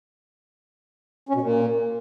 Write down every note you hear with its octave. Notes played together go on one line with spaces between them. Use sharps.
C#4
B2
A#2